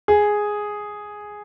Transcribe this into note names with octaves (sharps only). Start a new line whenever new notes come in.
G#4